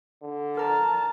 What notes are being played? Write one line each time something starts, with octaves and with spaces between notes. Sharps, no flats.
D3
A#4 A5 A#5